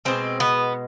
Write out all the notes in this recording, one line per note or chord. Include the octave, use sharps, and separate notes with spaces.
B2 G#3 C4
B3